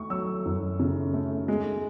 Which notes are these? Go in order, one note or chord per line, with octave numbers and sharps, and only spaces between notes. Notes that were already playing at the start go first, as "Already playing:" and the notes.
Already playing: A3 C#6
F#3 E6
F#2
C#3
A3
G#3